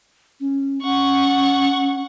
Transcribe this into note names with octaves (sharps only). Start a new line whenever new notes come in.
C#4
C#4 F#5 C#6